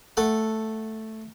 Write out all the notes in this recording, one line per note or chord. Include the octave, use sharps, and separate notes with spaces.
A3 A4 F#5 A5